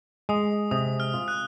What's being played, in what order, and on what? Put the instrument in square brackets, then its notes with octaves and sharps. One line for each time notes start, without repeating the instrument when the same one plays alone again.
[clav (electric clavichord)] G#3 [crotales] D#6
[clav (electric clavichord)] C3 [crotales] D#6
[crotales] F6
[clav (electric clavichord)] F4
[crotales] F#6